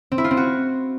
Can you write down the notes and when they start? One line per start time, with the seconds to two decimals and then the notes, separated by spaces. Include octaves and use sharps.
0.12 C4
0.18 E4
0.24 F4
0.31 C4
0.37 F#4